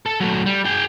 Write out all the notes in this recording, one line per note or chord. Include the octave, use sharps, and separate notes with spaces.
A4
F#3 A3
G3
G#4 G5